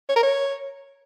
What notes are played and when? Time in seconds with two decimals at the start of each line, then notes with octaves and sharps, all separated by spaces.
0.09 C#5
0.16 A#4
0.23 C#5